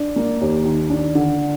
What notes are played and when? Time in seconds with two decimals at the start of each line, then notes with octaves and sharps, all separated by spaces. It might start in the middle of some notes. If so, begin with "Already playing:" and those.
Already playing: D4
0.16 A#3
0.41 D#2
0.65 D#3
0.90 D4
1.15 D3